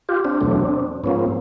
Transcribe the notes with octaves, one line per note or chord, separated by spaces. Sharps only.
F4 G4
C4 D4
E2 B2 F#3 A3
G#2 F3 A#3 B3 C#4
C4